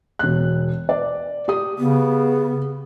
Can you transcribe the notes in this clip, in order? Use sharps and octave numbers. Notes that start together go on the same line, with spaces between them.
E1 F#6
D5
G4 D#6
C#3 B3